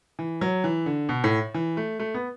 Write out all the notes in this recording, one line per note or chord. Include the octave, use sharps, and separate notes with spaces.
E3
F#3
E3
D3
B2
A2
E3
A3
A3
B3